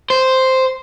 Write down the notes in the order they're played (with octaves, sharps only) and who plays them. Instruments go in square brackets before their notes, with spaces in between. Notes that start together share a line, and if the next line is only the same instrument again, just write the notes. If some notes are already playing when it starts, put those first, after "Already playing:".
[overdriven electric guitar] C5